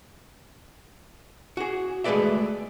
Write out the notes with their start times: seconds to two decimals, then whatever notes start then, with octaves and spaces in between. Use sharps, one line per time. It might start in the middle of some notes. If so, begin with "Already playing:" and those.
1.57 F#4 G#4
2.04 G#3 A3 G#4 B4 D5 E5